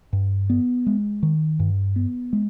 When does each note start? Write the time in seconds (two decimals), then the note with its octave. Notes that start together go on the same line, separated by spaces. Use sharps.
0.13 G2
0.50 B3
0.86 G#3
1.23 D#3
1.60 G2
1.96 B3
2.33 G#3